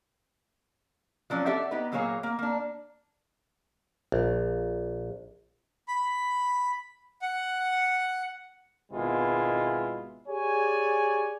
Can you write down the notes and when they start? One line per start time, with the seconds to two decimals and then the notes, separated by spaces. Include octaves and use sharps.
1.30 F3 F#3 C#4 D5
1.46 D4 G4 A4 D5 E5 F#5
1.71 B3 D#4 G4 B4
1.92 A#2 F#3 A#3 G#4 C#5 F5
2.23 A#3
2.39 A#3 D4
4.12 A#1
5.88 B5
7.22 F#5
8.92 G#1 B2 G#3 E4 F4
10.29 G4 G#4 C#5 D5 G#5